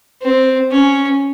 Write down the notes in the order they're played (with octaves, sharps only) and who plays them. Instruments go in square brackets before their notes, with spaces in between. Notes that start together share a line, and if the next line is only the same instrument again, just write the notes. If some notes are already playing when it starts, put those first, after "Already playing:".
[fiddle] C4
C#4